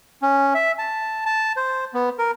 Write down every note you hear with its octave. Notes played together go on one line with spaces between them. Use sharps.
C#4
E5
A5
A5
C5
B3
A#4